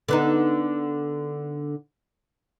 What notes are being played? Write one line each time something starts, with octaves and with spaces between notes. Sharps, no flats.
D3 B3 D#4